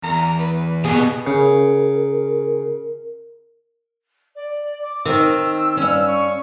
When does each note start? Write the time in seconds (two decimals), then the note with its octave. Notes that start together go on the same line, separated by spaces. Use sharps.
0.03 E2 A#5
0.39 B4
0.84 B2 G4 G#4 B4
1.27 C#3 A#4
4.35 D5
4.83 D6
5.05 D#3 C4 E6
5.77 G2 C#4
6.07 C#6